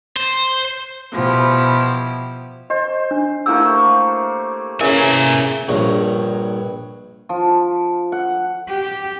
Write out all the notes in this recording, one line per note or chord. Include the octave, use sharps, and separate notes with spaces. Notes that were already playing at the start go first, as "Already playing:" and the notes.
C5
B2 F3 E4 G4
C5 D#5
D4
A3 A#3 E4 G4 E6
C#3 E3 A#3 A#4 E5 G#5
A#1 G2 C#5 A#5
F3
F#5
G4